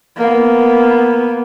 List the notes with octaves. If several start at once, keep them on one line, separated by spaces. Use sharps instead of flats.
A#3 B3